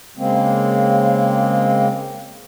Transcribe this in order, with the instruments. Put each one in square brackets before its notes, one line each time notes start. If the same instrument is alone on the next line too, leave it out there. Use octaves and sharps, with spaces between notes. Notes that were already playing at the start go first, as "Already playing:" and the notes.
[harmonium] C#3 G#3 A#3 C4